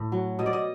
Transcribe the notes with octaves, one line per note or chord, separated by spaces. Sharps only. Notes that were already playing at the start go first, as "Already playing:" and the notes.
Already playing: A2
F#3
B2 D#5
D5
D#5